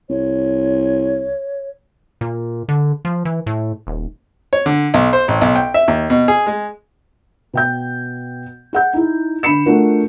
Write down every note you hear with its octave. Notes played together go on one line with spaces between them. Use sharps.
C2 C#5
A#2
D3
F3
E3
A2
D#1
C#5
D3
B1
C5
A1
B1
G5
E5
D#2
B2
G#4
G#3
B2 G5 G6
G#4 F#5 G6
D#4 E4
D3 B5 C7 C#7 E7
A3 D4 F4 F#4 A#4